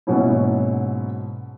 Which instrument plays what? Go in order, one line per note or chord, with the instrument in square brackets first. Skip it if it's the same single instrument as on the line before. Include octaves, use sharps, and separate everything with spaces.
[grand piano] G#2 B2 F#3 A#3 C#4 E4